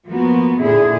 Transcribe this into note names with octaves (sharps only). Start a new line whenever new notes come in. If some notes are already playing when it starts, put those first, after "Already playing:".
F3 A#3 B3 F#4
A#2 D3 E4 G#4